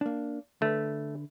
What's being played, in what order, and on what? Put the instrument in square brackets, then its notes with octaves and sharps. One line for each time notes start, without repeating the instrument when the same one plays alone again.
[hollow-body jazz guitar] A#3 D4
[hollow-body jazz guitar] D3 B4 [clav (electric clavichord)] A3